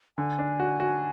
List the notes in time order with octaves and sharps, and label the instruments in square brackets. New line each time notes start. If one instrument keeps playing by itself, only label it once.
[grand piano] D3 [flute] G#5
[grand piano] D4
F#4
F#4